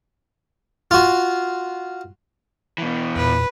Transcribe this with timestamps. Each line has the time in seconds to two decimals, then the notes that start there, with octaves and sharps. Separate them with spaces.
0.91 F4 F#4
2.78 B2 E3
3.16 E2 A#2 B4